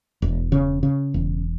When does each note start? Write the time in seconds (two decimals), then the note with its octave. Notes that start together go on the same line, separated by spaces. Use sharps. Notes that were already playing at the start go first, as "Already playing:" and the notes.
0.22 E1
0.52 C#3
0.83 C#3
1.14 E1